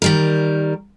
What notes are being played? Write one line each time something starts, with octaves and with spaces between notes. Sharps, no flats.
D#3 G3 A#4